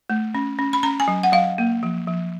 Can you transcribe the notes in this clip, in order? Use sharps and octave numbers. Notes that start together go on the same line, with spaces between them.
A3
C#4
C#4
B5
C#4 A#5
G#5
F#3
F#5
F#3 F5
A#3
F3
F3